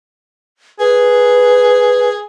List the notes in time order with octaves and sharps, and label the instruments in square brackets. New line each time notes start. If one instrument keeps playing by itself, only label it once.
[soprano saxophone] G#4 [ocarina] B4